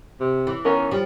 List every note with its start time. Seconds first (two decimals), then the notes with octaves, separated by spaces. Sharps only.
0.20 C3
0.47 E3
0.65 D#3 B3 C#4 A#4
0.91 F3 G3